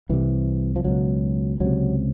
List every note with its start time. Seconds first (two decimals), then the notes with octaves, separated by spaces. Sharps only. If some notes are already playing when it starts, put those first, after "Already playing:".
0.09 C2 C3 E3
0.76 F3
0.85 C#2 B2 F#3
1.60 C#2 C3 F#3